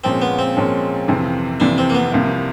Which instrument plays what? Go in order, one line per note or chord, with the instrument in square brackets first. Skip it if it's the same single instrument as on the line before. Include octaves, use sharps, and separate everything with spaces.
[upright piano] A#2 F3 G#3 C#4 [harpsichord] C4
[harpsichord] B3
C4
[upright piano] A#2 F3 G#3 C#4
F2 C3 E3
[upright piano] F2 C3 E3 [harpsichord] D4
[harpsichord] C4
A#3
B3
[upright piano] C2 C3 F3 A#3